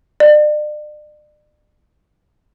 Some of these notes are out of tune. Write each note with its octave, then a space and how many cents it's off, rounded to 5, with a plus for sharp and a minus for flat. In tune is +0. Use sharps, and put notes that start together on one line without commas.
D5 +40